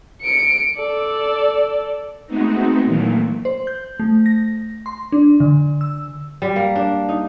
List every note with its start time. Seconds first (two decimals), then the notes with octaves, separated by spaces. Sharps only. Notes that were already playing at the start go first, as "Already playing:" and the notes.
0.22 C#7 D7
0.78 A4 D5
2.27 G#3 A3 B3 C4 D#4 F#4
2.84 A#2 D#3 E3 F#3 A3 A#3
3.45 C5
3.67 G6
4.00 A3
4.26 A#6
4.86 C6
5.12 D4
5.40 D3
5.81 E6
6.42 G3
6.56 A#3
6.76 D4
7.09 D#4